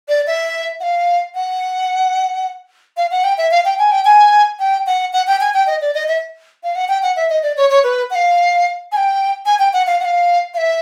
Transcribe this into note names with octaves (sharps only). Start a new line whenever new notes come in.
D5
E5
F#5
F5
F#5
F5
F#5
G5
E5
F5
G5
G#5
G5
G#5
G5
F#5
F#5
G5
G#5
G5
D#5
D5
D#5
E5
F5
F#5
G5
F#5
E5
D#5
D5
C#5
C#5
B4
F#5
F5
G#5
G5
G#5
G5
F#5
F5
F#5
F5
F5
E5